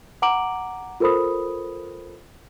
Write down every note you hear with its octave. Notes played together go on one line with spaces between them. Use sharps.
F#5 A#5 D6 D7 F#7
F4 A4 A#4 C5 B5 D#6